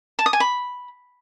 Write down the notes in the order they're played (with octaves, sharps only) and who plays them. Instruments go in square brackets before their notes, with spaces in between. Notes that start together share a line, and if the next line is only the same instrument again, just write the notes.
[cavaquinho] A5
D#6
G#5
B5